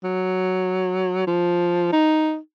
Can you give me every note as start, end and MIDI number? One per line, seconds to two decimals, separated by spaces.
0.04 1.26 54
1.27 1.92 53
1.92 2.37 63